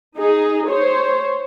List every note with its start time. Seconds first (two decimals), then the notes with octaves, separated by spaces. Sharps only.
0.17 D#4 G#4
0.69 C5 C#5